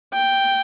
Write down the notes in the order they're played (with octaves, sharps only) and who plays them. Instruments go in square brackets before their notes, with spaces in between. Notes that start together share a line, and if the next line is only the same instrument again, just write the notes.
[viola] G5